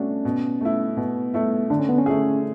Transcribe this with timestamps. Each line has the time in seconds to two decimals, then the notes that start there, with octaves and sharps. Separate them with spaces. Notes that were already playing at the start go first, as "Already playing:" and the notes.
Already playing: B2 A3 C#4 D4 F#4
0.25 B2
0.61 A3 E4
0.97 B2 B3
1.34 A3 E4
1.70 D3 D4
1.79 C#4
1.89 B3
1.98 C#4
2.06 A3 E4 G#4